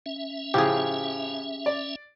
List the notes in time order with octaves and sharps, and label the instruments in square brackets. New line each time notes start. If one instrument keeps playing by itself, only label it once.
[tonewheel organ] C#4 E5
[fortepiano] A2 C#3 F3 [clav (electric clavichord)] G4 G#4
[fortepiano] D5